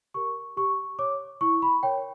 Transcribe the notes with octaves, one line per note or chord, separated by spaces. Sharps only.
G4 A#4 C#6
G4 C#6
C#5 D6
E4 C#6
B5
A#4 C#5 G5